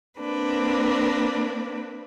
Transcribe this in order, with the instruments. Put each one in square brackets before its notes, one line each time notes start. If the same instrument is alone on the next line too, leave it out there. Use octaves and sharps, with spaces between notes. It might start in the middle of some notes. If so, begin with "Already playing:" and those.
[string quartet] A#3 C4 D4 B4